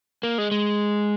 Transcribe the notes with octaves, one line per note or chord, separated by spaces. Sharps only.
A#3
G#3
G#3